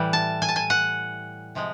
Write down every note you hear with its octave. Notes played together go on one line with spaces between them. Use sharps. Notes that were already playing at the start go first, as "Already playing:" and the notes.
Already playing: A2 E3 G3
A5
G#5
A5
G#5
F#5
C3 F3 G#3